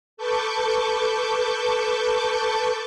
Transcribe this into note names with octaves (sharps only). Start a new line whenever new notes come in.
A4 B4 A5 C#6 D6 G6